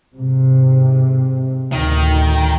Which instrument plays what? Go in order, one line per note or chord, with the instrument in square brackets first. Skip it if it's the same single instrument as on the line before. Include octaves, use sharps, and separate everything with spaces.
[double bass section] G#2 C3
[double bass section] D2 A2 [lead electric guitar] D#3